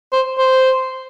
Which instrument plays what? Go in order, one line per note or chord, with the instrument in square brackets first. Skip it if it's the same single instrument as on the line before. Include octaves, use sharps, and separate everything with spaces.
[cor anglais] C5
C5